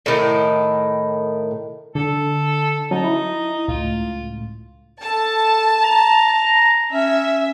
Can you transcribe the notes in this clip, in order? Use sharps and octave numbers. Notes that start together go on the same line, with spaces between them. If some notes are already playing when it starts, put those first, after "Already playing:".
A2 D#3
D3 A4
F#3 C#4 D#4 A5
E4
C#2 A2 F4
A4 A5
A#5
C#4 E5